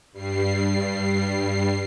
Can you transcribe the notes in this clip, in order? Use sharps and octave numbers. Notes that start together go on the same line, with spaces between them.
G2 G3 C7